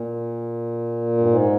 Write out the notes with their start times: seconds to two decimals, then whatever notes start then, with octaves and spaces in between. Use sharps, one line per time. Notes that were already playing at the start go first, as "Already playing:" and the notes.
Already playing: A#2
1.17 G2
1.27 G#2